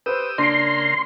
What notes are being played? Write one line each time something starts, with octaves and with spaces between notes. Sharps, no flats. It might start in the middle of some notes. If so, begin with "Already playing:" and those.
G4 B4 C5 D#6 E6
C#3 A#3 D4 A#4 C6 D7